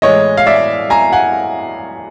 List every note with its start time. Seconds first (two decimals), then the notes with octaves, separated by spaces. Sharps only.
0.02 A2 E3 G#3 C#5 D#5
0.37 F5
0.47 D5 E5
0.90 G#5 A#5
1.12 F#5 G#5